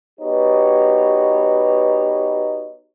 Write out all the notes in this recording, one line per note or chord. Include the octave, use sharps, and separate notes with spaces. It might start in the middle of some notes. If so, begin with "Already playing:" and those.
B3 D#4 F#4 G4 B4 C#5